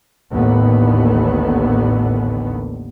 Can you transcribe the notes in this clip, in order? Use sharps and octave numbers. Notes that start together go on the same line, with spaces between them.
A1 D#2 A2 D3 B3